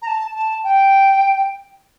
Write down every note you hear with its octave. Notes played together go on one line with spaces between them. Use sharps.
A#5
A5
A5
G5